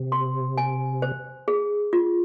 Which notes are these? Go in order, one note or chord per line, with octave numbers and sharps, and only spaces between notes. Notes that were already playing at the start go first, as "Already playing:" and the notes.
Already playing: C3
C6
G#5
C5
G#4
F4